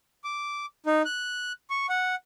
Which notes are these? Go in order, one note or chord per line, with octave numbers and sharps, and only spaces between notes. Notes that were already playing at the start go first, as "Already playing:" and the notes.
D6
D#4
F#6
C#6
F#5